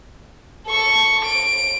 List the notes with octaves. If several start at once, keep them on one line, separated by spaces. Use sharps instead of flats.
A4 C#6
D7